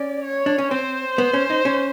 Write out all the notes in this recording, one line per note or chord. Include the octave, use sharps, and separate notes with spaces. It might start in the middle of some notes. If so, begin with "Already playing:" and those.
Already playing: C#4 D5
C#5
D4
C#4
C4 C5
B3
C#4
D#4
C#4